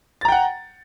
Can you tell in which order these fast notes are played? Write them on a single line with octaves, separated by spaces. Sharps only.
A6 A#5 G5 F#5